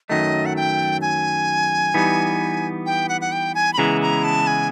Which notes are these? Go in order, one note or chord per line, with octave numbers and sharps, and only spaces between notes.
F#2 D#3 F#3 A3 D#5
F#5
G5
G#5
E3 G3 B3 D#4
G5
F#5
F#5
G5
G#5
B5
C#3 E3 G#3 B3 E4 A#5
A#5
A5
G#5